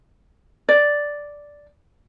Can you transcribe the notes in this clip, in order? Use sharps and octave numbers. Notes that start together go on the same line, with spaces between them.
D5